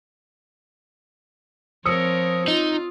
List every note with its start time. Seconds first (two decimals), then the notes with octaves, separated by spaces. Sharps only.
1.85 F3 C4 A#4 C#5 D#6 E6 C#7
2.48 D#4 F4